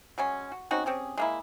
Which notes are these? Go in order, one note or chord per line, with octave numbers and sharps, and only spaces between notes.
F#3 G#3 C#4
F#4
C4 C#4 D#4 F#4
C4 C#4 G4 G#4
G#3 A#3 E4